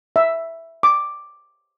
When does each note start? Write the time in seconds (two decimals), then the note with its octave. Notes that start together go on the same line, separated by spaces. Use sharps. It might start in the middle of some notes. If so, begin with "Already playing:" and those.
0.16 E5
0.83 D6